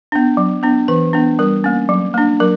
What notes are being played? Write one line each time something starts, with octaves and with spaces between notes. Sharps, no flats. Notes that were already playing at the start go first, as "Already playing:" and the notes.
B3 D4
F#3
B3 D4
E3 B4
B3 D4
G3 A#4
A#3 C#4
F#3
A#3 D4
F#3 A#4